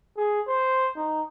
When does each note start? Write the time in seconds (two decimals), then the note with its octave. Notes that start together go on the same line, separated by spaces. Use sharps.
0.17 G#4
0.48 C5
0.97 D#4